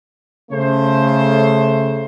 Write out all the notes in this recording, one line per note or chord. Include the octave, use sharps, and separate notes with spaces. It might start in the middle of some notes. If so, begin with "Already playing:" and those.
C#3 A3 C5